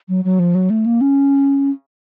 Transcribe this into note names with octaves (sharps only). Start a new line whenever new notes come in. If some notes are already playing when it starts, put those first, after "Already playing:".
F#3
F#3
F3
F#3
A3
A#3
C#4